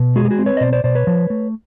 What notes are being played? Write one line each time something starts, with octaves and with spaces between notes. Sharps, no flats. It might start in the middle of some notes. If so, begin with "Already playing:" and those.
Already playing: B2
G#3 F#4 G#4
G4
F#4 G#4
C4
B4 C#5
D#5
B2 C5 D5
C5 D5
B2 C5 D5
B4 C#5
F3
A3